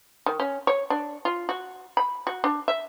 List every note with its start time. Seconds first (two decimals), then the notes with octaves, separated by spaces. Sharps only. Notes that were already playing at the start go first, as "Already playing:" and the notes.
0.26 D#3
0.40 C#4
0.67 C#5
0.90 D4
1.25 F4
1.49 F#4
1.97 B5
2.27 F#4
2.44 D4
2.68 E5